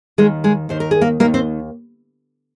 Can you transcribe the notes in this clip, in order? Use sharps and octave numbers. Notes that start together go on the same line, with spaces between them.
D#2 D#3 G#3 G#4
G#3 G#4
D#2 D#3 C5
A#4
G#4
A#3 A#4
D#2 D#3 A#3 A#4
C4 C5